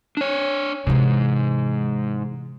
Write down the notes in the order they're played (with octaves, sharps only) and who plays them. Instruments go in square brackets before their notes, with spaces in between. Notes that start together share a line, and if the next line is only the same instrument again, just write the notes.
[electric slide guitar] D4 C#5
[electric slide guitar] G#2 [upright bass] C3 E3